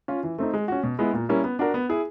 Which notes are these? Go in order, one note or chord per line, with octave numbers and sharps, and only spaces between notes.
C#4 F4
E3
A3 C4 D#4
G#3
C#4 F#4
B2
G#3 B3 E4
A#2
G3 A#3 C#4 E4
B3
D4 F#4 A#4
B3
E4 G#4